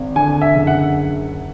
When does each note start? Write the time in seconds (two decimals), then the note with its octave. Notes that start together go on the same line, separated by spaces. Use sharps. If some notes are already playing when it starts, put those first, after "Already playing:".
Already playing: G#1
0.16 D3 G#5
0.41 E5
0.54 F#1
0.67 F#5